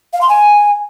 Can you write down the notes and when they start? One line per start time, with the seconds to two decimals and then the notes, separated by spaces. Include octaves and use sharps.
0.13 F5
0.21 C6
0.29 G#5